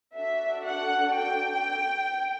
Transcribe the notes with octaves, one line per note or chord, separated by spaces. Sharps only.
D4 F#4 A4 E5
F#5
G5